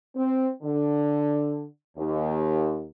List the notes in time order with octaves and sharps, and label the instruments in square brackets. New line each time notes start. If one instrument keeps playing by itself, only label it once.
[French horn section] C4
D3
D#2